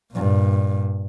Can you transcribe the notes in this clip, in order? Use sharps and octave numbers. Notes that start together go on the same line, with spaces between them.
G2 A#2